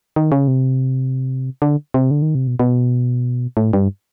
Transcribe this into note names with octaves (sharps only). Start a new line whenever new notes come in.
D#3
C#3
C3
D3
C3
D3
D#3
C3
B2
B2
A2
G2